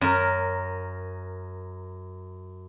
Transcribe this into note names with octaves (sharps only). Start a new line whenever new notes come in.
F#2 A#4